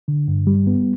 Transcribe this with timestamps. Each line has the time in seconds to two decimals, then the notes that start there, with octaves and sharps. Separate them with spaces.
0.08 D3
0.28 G2
0.47 G3
0.67 B3